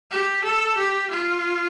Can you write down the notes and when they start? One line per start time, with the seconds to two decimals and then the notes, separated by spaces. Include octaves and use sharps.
0.11 G4
0.44 A4
0.77 G4
1.11 F4